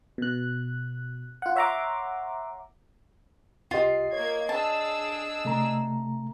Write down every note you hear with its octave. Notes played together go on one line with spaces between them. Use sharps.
B2 F#6
F4 F#5
C#5 E5 F#5 A#5 C6 D6
C2 F4 G4 D#5 C7
A#3 C#5 G#6
D4 G#4 A5 E6
C3 A3 A#5